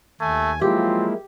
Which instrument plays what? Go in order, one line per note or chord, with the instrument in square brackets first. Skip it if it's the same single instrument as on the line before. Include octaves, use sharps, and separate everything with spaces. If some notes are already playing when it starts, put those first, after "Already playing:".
[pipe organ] D#2 G#5 [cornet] A3
[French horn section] F3 F#3 F4 [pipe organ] G#3 A#3 E4 [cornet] C4 [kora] G4